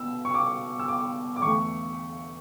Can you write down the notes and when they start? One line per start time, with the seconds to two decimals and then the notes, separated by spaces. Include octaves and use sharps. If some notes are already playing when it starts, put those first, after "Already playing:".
Already playing: B2 E6
0.25 C#6
0.34 D6
0.79 E6
0.88 D6
1.36 D6
1.42 E2 D3 A3 C#6